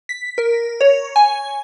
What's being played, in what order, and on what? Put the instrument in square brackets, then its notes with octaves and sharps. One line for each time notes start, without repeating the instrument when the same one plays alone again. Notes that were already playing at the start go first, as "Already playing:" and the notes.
[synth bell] B6
A#4
C#5
G#5